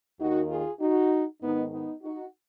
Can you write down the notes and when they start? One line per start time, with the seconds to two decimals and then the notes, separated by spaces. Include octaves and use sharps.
0.19 D#2 D#3 D#4 F#4
0.49 F4 G#4
0.80 D#4 F#4
1.41 G#2 D#3 B3 D#4
1.72 B3 D#4
2.02 D#4 F#4